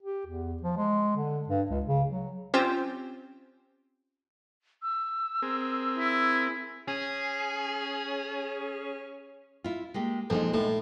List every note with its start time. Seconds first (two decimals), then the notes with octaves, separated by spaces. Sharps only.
0.02 G4
0.27 E2
0.63 F3
0.77 G#3
1.16 D3
1.48 G2
1.71 C#2
1.86 C#3
2.09 F#3
2.54 C4 C#4 F4 G4 C5 G5
4.82 E6
5.42 C4 G#4 A#4
5.98 E4
6.88 C#4 G#4
9.64 E4 F4
9.94 G#3 A#3 G4
10.30 F2 A#2 G#3 D#4
10.54 A2